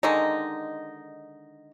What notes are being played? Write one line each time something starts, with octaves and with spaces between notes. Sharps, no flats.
D3 D#3 G#3 D#4